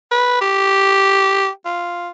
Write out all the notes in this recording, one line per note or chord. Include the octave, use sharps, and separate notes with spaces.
B4
G4
F4